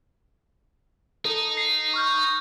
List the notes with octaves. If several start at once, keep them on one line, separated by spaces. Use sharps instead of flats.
D#4 A4
C7
C#6 F6 G6